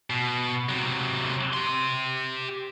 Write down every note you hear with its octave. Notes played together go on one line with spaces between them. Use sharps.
B2
C3 F#3
G4 C6